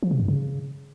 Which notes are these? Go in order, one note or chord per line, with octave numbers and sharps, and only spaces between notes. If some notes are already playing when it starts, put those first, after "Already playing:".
F3
C3
G2
C#3